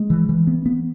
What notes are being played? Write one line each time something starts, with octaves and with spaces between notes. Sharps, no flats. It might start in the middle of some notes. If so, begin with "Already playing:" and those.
Already playing: G#3
E3
E3
B3
B3